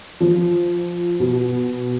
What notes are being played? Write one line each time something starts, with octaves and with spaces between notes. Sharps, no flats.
F3
B2